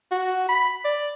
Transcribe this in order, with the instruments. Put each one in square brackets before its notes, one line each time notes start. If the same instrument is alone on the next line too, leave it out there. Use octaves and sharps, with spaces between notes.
[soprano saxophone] F#4
B5
D5